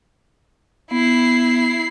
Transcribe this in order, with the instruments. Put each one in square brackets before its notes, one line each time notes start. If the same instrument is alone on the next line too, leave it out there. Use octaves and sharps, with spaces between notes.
[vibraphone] B3 [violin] E4 C7